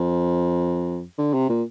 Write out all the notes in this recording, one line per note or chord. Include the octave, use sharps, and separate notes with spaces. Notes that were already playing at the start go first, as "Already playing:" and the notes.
Already playing: F2
D3
C3
A#2